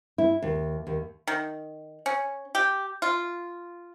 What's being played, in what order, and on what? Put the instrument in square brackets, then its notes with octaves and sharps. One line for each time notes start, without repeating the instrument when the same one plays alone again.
[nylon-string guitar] E4
D#2
D#2
[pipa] D#3
C#4
G4
F4